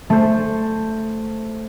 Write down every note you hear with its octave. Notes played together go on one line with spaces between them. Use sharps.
A3 C5